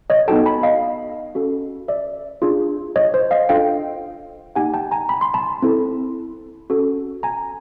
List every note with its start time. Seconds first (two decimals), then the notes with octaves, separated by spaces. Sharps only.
0.10 C#5 D#5
0.28 B3 D#4 F#4 A4 G5 A5
0.46 A5 B5
0.63 D#5 F5
1.35 C#4 F#4 A4
1.88 D5 E5
2.42 D4 F4 G#4
2.96 C#5 D#5
3.14 C5
3.31 D#5 F5
3.49 D4 F4 A4 F5 G5
4.55 A#3 D#4 G4 F#5 G#5
4.74 G5 A5
4.91 G#5 A#5
5.09 B5
5.21 C6
5.34 A5 B5
5.62 C4 E4 A4
6.70 C#4 F#4 A4
7.23 G#5 A#5